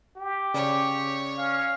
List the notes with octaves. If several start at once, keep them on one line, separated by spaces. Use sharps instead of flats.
G4
C#3 C#5 D5
C#4 F5